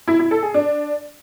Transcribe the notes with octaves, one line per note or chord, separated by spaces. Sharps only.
E4
E4
A4
G#4
D4